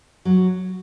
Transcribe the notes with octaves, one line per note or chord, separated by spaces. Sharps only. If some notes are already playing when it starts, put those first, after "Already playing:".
F#3